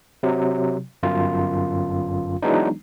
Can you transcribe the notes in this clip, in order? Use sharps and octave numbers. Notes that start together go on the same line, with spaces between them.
C3 F#3
G1 F#2 F4
E3 F#3 G#3 B3 D4 D#4